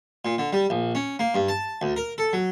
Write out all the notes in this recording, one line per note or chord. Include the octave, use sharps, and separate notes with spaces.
A#2
D3
G3
A#1
C#4
A#3
G2
A5
D2
A#4
A4
F#3